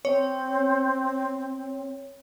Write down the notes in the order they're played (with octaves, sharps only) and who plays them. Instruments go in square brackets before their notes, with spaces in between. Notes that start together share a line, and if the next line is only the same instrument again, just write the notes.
[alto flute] C4 [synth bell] C#5